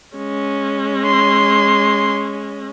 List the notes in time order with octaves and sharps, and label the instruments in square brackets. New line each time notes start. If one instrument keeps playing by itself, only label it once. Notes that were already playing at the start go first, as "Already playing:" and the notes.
[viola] G#3 C#4
[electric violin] C6